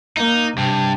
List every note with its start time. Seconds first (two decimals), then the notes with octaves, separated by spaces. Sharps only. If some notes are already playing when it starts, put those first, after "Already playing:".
0.17 A#3 D#4
0.58 G2 C3